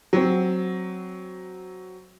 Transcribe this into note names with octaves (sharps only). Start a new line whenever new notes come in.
F#3 C4